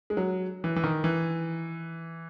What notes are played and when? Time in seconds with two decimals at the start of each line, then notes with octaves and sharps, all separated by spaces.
0.10 G#3
0.17 F#3
0.64 E3
0.76 E3
0.84 D#3
1.04 E3